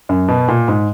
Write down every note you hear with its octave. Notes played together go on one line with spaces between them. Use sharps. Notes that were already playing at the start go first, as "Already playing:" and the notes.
F#2
B2
A#2
G#2